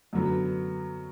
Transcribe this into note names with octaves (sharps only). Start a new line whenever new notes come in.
F#2 D3 F#3 B3